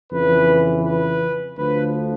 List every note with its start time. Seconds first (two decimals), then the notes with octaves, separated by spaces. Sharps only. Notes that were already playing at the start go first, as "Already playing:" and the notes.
0.11 F2 C#3 E3 B4
0.84 B4
1.57 D2 D3 F3 B4